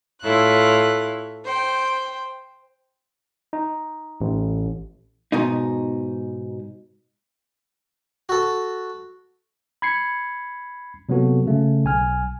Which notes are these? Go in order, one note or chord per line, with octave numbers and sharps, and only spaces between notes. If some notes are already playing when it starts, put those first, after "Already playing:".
A2 E4 F4 A4 C#5 F#6
C5 G5
D#4
A1
G#2 B2 D#4
F#4 A4
B5 G#6 C7 C#7
C3 F#3 A#3 B3 F#4 A4
C#3 A3
B1 G#5 F6